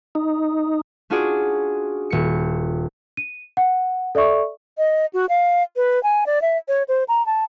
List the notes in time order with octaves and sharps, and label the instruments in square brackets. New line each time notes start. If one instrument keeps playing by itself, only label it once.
[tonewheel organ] D#4
[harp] C#4 D4 F4 F#4 G#4 D5
D#1 C#7
[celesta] D#7
F#5
A4 D5 E5 C#6
[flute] D#5
F#4
F5
B4
G#5
D5
E5
C#5
C5
A#5
A5